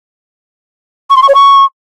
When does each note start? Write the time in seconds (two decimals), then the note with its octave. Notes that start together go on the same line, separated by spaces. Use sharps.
1.10 C#6
1.16 C6
1.22 C#6
1.28 C#5
1.34 C#6